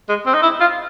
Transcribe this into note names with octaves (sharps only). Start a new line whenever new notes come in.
G#3
C4
D#4
E4
F4